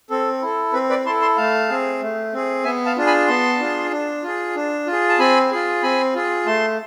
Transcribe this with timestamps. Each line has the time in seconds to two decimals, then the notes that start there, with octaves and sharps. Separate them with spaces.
0.10 C4 A4
0.42 E4 A4
0.73 C4 B4
0.90 B4 D5
1.05 E4 A5 C6
1.09 A4
1.21 A5 C6
1.37 A3 F5 A5
1.69 C4 G#4
2.02 A3
2.33 C4 G#4
2.64 B3 E5 G#5
2.85 F5 A5
2.97 D4 F4 G#4
3.07 G#5 B5
3.28 B3 A5 C6
3.60 D4 F4 G#4
3.91 D4
4.23 F4 G#4
4.56 D4
4.87 F4
4.92 G#4
5.09 A5
5.19 C4 G#5 B5
5.51 F4 G#4
5.82 C4 G#5 B5
6.15 F4 G#4
6.46 A3 A5 C6